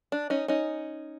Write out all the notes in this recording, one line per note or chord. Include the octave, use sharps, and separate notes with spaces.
D4
C#4 D#4
C#4 D#4